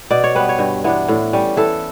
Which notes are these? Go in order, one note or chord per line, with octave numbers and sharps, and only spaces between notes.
B2 D5
C#5
G3 B3 B4
C#5
G2
E3 B3 D4
A2
G3 C#4
E3 A4